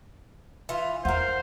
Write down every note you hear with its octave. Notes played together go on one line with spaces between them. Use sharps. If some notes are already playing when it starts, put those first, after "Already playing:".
E3 F4
E2 F4 A#4 C5 F#5